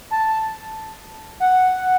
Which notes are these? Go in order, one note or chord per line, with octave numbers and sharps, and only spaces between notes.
A5
F#5